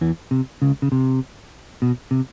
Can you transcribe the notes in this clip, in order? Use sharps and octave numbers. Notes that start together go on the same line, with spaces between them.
E2 E3
C3
C#2 C#3
C#3
C3
B2
C3